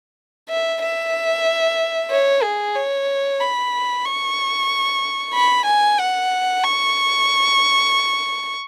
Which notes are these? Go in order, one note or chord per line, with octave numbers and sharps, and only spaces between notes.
E5
E5
C#5
G#4
C#5
B5
C#6
B5
G#5
F#5
C#6